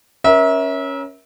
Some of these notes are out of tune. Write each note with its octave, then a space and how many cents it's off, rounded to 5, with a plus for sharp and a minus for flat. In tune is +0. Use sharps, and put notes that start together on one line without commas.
C#4 +0 A#4 +30 E5 -25